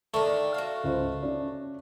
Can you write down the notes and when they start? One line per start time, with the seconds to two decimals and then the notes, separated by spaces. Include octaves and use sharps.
0.14 D3 D#3 A3
0.54 F#4 F5
0.84 C#2 C5
1.23 C#4 D5